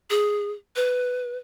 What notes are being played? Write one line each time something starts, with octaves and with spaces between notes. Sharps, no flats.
G#4
B4